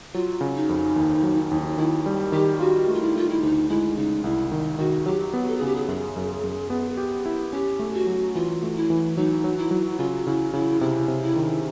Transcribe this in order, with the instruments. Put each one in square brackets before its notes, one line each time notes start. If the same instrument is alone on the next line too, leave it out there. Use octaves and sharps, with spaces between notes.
[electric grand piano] F#3 [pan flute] F4
[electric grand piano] C#3
[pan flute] D#4
[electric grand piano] F2
D#2
F#3
D#2
[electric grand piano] D#3 [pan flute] E4
[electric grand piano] G3
[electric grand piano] D#3 [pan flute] G4
[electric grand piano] F4 [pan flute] F#4
[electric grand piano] A3
[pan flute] F4
E4
[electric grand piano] A3 [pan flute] F4
[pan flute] E4
[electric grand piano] D2 [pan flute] D#4
[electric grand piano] G#3 [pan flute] E4
[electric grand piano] C#3 [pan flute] D#4
[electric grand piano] C2 [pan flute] E4
[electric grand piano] D#3
[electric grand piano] D#3 [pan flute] F#4
[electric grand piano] F#3 [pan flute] G4
[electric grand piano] B3
[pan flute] A4
G#4
[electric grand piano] C#3 [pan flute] G4
[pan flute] G#4
[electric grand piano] F#2 [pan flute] G#4
[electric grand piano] F#2
F#2
B3
G4
E4
[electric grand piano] C#4 [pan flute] G4
[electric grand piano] A3
[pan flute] F#4
[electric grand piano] F#3
[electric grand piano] E3 [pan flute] F4
[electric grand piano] A3
[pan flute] E4
[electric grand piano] E3
[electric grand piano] F#3 [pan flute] D#4
[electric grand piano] F#3
[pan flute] E4
[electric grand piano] F#3
[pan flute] E4
[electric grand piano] C#3 [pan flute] F4
[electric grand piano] C#3 [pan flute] E4
[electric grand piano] C#3 [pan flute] E4
[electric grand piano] C3 [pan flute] E4
[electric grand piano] C3
[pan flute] E4
[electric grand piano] D#3